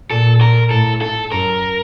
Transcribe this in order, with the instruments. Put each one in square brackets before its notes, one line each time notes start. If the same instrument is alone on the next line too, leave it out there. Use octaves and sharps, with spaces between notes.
[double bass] A#2 [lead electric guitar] A4
[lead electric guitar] A#4
[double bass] A2 [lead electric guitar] A4
[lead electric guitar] A4
[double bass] F#2 [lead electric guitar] A#4